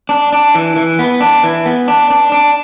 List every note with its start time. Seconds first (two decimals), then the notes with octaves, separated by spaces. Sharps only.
0.09 D4
0.33 D4
0.55 E3
0.76 E3
0.99 B3
1.21 D4
1.44 E3
1.66 B3
1.88 D4
2.10 D4
2.32 D4